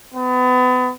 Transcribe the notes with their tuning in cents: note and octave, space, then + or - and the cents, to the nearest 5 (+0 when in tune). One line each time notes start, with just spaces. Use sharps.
B3 +35